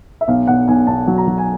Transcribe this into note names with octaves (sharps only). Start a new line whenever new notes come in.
E5
B1 F5
B1 F#5
B1 G#5
B1 A5
F#3
A#5
F#3
G#5